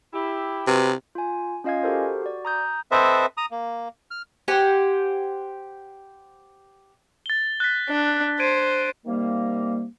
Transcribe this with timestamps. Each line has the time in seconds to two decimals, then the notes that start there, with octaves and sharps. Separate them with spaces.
0.13 E4 G4
0.67 C3 F#3 B4
1.15 F4 G#5
1.64 C#4 F4 D#5 F5 G#5 G#6
1.83 F#4 G4 A4 A#4 C5
2.22 F#4 D5
2.45 A#5 D#6 G6
2.91 C4 A4 B4 C5 D#5 E5
3.37 A#5 D#6
3.51 A#3
4.11 F6
4.48 G4 C5 F#5 G#5
7.26 A6 G7
7.60 F#6 A6 B6
7.89 D4
8.39 C5 G#6 D7 D#7
9.06 C3 D#3 G3 A#3